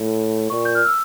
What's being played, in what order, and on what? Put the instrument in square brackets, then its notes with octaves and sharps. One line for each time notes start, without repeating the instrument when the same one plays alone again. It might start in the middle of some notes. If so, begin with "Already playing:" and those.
Already playing: [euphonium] A2
[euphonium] A#2 [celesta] C#6
[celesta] G6
F6
E6